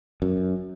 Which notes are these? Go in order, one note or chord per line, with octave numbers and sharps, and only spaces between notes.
F#2